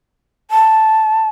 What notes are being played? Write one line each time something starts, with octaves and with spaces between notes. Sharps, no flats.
A5